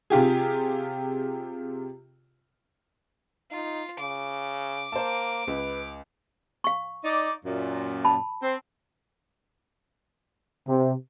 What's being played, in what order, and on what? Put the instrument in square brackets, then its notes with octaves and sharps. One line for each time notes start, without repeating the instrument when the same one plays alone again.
[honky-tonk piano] C3 F4 G4 G#4
[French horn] D#4 [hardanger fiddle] F4
[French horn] C#3 [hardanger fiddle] D6
[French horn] A#3 [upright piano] C5 A5
[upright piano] C#2 [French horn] B4
[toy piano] F5 C#6
[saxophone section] D#4 D5
F#2 A#2
[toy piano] A5 B5
[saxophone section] C4
[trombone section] C3